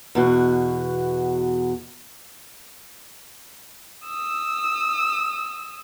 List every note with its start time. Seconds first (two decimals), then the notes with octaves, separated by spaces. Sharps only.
0.15 E2 B2 F#4
4.06 D#6 E6